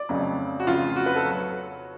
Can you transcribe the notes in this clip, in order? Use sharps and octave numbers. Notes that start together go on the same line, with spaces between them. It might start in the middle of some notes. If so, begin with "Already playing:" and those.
Already playing: D5
F1 F2 C#3 F#3
F#4
F1 F2 C#3 F3 F4
F#4
B4
A4
F#3